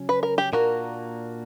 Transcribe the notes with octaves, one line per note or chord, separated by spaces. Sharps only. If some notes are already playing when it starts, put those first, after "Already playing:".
Already playing: C#3 F#3 C#4
B4
A#4
G4
A#2 A#3 D4 F#4 A#4